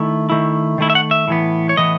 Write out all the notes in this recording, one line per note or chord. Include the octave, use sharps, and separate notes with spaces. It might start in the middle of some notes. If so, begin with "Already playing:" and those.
Already playing: D#3 A3 E4
D#3 A3 E4
D#3 A3 E4
E5
F#5
E5
A2 E3 B3
C#5
A2 E3 B3 D#5